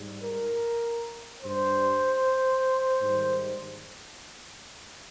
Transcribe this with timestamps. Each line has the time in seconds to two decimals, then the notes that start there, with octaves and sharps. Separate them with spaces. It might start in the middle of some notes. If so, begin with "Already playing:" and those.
Already playing: G#2 G3
0.24 A#4
1.42 G2 G3 C5
3.01 G#2 D#3 G3